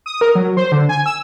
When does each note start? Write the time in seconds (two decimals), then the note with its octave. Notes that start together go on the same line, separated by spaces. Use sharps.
0.06 D#6
0.21 A#4
0.35 F#3
0.57 C5
0.72 D3
0.89 G#5
1.06 E6